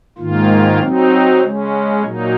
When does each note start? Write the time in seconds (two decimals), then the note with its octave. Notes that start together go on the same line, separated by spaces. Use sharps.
0.18 G#2 D#3 A#3 F4
0.80 F#3 C4 D#4
1.41 C#3 G#3 C#4
2.02 A#2 F#3 A#3 D#4